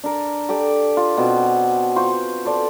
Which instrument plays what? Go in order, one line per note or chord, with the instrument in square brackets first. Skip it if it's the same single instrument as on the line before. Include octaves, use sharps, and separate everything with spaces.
[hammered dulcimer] D4 A#4
G4 A4 D5
F4
B2 C4 F#4
F4 C5 C#6
A4 C5 D5 A5